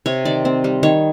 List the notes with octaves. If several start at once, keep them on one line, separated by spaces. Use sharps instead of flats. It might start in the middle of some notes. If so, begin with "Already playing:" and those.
C3 C#5
D#3 D5
C4
G3
D#3 C#5